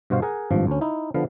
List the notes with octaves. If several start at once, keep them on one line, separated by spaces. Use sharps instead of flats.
G2 B2 F#4 C5 F5
G#4 A#4 F#5 G#5
G#1 G2 F3
D2 C#4
D#4 E4
D3 F3 B3 F5